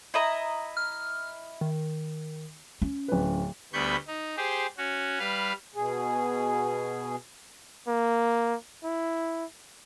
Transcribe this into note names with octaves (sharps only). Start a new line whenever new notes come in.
E4 D#5 A#5
F6
D#3
C#4
D1 B4
D2 G3 B3 B5 C#6 G6
D#4
G4 G#4 C5
C#4 F#4
G3 B4 F5
B2 G#4
A#3
E4